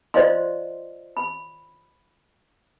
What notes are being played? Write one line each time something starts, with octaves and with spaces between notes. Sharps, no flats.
F4 C5 D5 D#5 F5 C6
B5